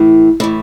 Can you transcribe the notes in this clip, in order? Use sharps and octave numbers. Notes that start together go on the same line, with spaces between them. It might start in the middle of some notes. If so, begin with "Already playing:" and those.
Already playing: A2 E3
A2 E3 E4